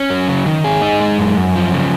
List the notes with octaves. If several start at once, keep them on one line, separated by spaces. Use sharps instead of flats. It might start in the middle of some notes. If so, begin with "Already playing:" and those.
Already playing: C#4
F#3
C#3
D#3
G#4
D#4
G#3
F#2
F#2
F3
C#3